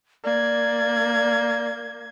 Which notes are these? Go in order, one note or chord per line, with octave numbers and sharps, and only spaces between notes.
A#3 D5 G#6